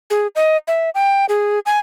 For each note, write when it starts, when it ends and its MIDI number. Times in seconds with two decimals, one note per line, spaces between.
0.10 0.27 68
0.36 0.57 75
0.68 0.90 76
0.95 1.25 79
1.29 1.59 68
1.66 1.79 80